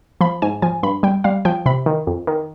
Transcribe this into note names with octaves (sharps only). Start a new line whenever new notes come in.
F3 B5
G#2 G#5
F3 G#5
G2 B5
G3 G5
G3 F5
F3 G5
C3 B5
D#3
F2
D#3